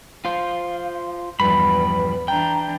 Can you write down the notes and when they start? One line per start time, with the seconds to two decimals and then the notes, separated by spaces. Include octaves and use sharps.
0.25 F4 C5 F5
1.40 E2 G2 F3 G3 B4 B5
2.28 E3 D4 G5 A#5